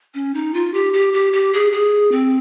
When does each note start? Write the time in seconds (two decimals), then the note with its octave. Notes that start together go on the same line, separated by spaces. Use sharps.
0.14 C#4
0.34 D#4
0.54 F4
0.74 G4
0.93 G4
1.13 G4
1.33 G4
1.53 G#4
1.72 G#4
2.12 C4